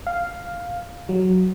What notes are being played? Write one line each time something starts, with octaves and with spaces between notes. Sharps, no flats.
F5
F#3